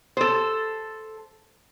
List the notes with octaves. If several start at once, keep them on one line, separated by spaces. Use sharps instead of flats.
A4 C5